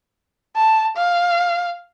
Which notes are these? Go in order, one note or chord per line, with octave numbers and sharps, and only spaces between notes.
A5
F5